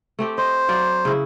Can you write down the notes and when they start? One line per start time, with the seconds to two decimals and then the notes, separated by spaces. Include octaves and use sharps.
0.19 A3 C4 G4
0.38 C5 D#5
0.69 F#3 D5 F5
1.05 C#3 E4